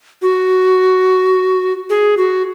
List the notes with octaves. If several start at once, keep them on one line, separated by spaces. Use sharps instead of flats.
F#4
G#4
F#4